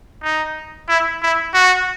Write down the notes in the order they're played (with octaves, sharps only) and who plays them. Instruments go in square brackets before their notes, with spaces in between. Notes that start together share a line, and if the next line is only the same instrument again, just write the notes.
[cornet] D#4
E4
E4
F#4